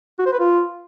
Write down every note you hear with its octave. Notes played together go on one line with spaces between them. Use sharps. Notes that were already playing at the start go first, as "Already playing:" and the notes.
F#4
C5
B4
F4